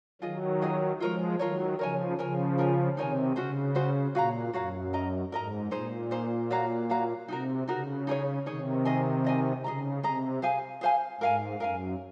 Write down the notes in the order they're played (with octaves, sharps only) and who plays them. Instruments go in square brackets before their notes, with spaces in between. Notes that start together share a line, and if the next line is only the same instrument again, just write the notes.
[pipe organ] D#3 F#3 [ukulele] F4 G#4 D#5
[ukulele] F4 G#4 D#5
[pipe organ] F3 G#3 [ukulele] F4 A#4 C#5
[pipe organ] D#3 F#3 [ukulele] F4 A#4 C#5
[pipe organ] C#3 F3 [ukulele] A#4 C#5 G#5
[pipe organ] C#3 F3 [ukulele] A#4 C#5 G#5
[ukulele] D#4 A#4 C#5 G#5
[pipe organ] C3 D#3 [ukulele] D#4 A#4 C#5 G#5
[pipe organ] C#3 [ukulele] C#4 F#4 C5
[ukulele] C#4 F#4 C5
[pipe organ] A#2 [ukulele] F#4 C#5 F5 A#5
[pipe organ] F#2 [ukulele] F#4 C#5 F5 A#5
[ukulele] A#4 D#5 A#5
[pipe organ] G#2 [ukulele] A#4 D#5 A#5
[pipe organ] A#2 [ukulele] D#4 G#4 C5
[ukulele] D#4 G#4 C5
F#4 C#5 F5 A#5
F#4 C#5 F5 A#5
[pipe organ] C3 [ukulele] D#4 F#4 A#4
[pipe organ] C#3 [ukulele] D#4 F#4 A#4
[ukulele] D#4 G#4 C#5
[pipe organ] C3 D#3 [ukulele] D#4 G#4 C#5
[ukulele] G#4 D#5 G#5
G#4 D#5 G#5
[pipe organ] C#3 [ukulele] G#4 D#5 A#5
[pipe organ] C3 [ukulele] G#4 D#5 A#5
[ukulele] G#4 C5 F5 G#5
G#4 C5 F5 G#5
[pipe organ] G#2 [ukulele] A#4 F5 G#5
[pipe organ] F#2 [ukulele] A#4 F5 G#5